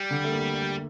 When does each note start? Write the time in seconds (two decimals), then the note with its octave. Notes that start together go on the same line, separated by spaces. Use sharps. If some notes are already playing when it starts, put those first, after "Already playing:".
Already playing: G3
0.11 D3
0.24 A3
0.31 A#3